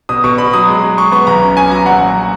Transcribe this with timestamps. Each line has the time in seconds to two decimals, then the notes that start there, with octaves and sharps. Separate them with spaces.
0.09 B2 D#6
0.24 B2 C#6
0.38 B2 B5
0.53 F#3 D#6
0.68 G#3
0.84 G#3
0.97 G#3 C#6
1.12 B3 C#6
1.27 B1 A#5
1.42 C#4
1.57 C#4 G#5
1.71 F#3 A#5
1.86 A#1 F#5
2.01 A#1